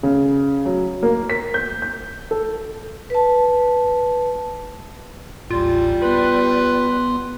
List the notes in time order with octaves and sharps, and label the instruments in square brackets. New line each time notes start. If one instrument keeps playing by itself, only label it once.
[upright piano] C#3
F#3
A#3
B6
G6
G6
A4
[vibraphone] B4 A5
[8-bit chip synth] A1 D#2 A2 [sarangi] G3 [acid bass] F4
[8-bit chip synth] B3 C6 [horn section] B4